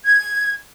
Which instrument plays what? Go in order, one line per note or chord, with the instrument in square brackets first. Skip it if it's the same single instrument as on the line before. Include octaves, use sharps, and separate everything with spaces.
[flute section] G#6